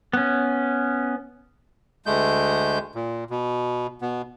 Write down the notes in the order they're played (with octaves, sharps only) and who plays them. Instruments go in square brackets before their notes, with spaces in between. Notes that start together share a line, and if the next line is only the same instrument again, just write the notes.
[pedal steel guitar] B3 C#4
[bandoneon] D2 G#3 A3 G6
A#2
B2
B2 B3